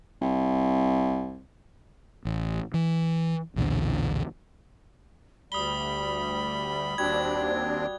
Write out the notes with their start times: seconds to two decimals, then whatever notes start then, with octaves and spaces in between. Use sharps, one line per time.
0.21 C2
2.25 A1
2.74 E3
3.56 B1 E2 A#2 D3
5.52 D2 G3 B5 D#6 G7
6.98 D#2 G3 C4 D4 F#4 G#6